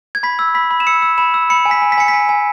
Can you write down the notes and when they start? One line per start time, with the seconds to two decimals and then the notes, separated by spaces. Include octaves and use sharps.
0.15 G#6
0.23 B5 B6
0.39 E6
0.55 B5 B6
0.71 B5
0.80 E7
0.87 E6 C#7
1.02 E6
1.18 B5 E7
1.34 E6
1.50 B5 C#7
1.65 G#5
1.71 B6
1.82 G#5
1.92 B6
1.98 G#5 C#7
2.08 B6
2.13 G#5
2.29 G#5